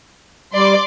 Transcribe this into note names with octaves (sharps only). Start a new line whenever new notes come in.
G3 D5 C6 D6